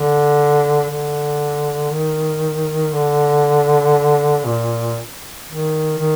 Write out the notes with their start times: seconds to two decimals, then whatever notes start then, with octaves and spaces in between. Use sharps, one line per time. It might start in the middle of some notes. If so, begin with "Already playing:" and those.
Already playing: D3
0.89 D3
1.91 D#3
2.93 D3
4.45 A#2
5.48 D#3
5.99 D#3